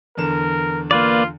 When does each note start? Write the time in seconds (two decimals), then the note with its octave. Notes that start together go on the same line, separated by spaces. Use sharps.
0.17 E2 D3 A#4 E7
0.91 A#3 F4 B4 D5